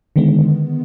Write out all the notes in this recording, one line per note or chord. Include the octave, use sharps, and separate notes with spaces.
D3 D#3 G#3 B3